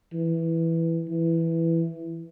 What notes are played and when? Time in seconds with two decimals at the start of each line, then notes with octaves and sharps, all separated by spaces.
0.13 E3
1.08 E3